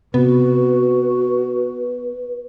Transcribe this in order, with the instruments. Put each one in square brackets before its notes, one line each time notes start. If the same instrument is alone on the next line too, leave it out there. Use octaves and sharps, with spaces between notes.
[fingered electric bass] C3 [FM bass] B3 [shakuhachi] F#4 [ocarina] B4